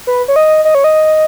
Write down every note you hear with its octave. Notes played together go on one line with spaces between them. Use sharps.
B4
C#5
D#5
D#5
C#5
D#5